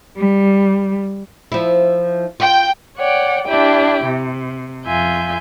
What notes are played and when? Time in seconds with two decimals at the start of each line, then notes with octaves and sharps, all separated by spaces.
0.16 G3
1.52 F3 E4
2.40 F4 G5
2.96 C#5 D5 F#5 G5
3.46 D4 E4 G4 G5
4.04 C3
4.86 F2 F4 E5 G#5 G6